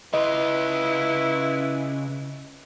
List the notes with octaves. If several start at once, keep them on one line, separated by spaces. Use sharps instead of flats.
C#3 E4 F4 B4 D#5